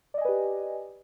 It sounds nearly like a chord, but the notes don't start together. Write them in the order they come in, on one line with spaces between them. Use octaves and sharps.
D5 D#5 G#5 B4 G4